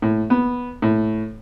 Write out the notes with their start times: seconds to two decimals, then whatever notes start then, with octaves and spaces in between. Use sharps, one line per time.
0.02 A2
0.30 B3
0.82 A2